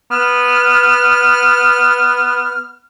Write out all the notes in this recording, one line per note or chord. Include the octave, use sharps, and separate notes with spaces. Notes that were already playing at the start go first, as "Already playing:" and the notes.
B3 F6